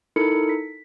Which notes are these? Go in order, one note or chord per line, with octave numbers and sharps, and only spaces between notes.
D#4 E4 A4 A#4 B5 C#7
B6